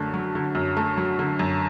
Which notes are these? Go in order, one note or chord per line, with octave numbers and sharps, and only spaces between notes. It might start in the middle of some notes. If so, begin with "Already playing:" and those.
Already playing: F#2 D3 A3
F#3
D3
F#2
A3
F#3
D3
F#2